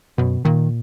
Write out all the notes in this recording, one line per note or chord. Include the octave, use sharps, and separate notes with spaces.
F#2 B2
A#2 D#3